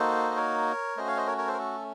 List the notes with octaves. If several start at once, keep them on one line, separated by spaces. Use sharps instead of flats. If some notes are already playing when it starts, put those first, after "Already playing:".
Already playing: A#3 D#4 F#4 A4 C5
D#5
A#4 C#5
A3 C#4 F#4 C5 D#5
C#5 F5
C5 D#5
A#4 C#5
A#4 C#5
A4 C5
A#4
A4